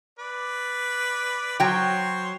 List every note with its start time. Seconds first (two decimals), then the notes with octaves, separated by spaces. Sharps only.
0.19 B4 D5
1.60 F#3 C5 C#5 G5 C6